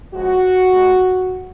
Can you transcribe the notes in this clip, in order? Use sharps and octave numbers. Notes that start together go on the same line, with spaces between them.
C#3 F3 G#3 F#4
B2 G#3